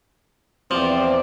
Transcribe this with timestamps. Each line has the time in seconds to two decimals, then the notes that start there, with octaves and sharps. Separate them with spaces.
0.71 E2 F3 C4 D5